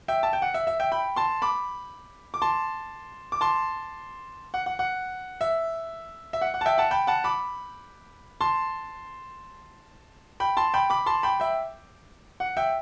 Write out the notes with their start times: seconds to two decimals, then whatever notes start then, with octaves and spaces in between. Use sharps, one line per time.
0.08 E5 G5
0.23 A5
0.33 G5
0.42 F#5
0.54 E5
0.67 E5
0.80 E5 G5
0.92 G5 B5
1.16 A5 C6
1.42 B5 D6
2.34 D6
2.42 A5 C6
3.32 D6
3.41 A5 C6
4.54 F#5
4.66 F#5
4.79 F#5
5.41 E5
6.33 E5
6.41 F#5
6.54 F#5
6.61 A5
6.66 E5 G5
6.78 F#5 A5
6.91 G5 B5
7.07 F#5 A5
7.24 B5 D6
8.41 A5 C6
10.40 G5 B5
10.57 A5 C6
10.74 G5 B5
10.90 B5 D6
11.06 A5 C6
11.23 G5 B5
11.40 E5 G5
12.40 F#5
12.57 E5 G5